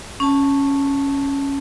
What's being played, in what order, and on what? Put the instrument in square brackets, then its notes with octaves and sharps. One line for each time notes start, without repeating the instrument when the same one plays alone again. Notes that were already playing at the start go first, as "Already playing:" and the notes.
[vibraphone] C#4 A5